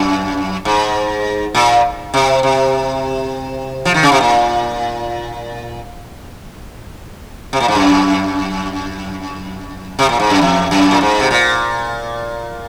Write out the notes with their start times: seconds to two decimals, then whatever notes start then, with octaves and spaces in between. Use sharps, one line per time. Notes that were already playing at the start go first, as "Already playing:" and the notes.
Already playing: F#2
0.65 G#2
1.55 A#2
2.14 C3
2.43 C3
3.85 F3
3.94 D#3
4.03 C#3
4.12 C3
4.21 A#2
7.53 C3
7.60 A#2
7.68 G#2
7.75 F#2
9.99 C3
10.09 A#2
10.20 G#2
10.30 F#2
10.41 F2
10.71 F#2
10.91 A#2
11.01 G#2
11.20 C3
11.31 A#2